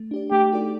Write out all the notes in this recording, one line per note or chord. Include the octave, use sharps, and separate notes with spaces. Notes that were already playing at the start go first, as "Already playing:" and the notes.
Already playing: A3
D4 G4 D5
A3 G4
D#4 F#4 A4 D5